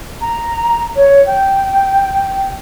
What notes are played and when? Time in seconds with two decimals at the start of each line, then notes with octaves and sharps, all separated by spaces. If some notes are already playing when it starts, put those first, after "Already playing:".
0.21 A#5
0.96 C#5
1.26 G5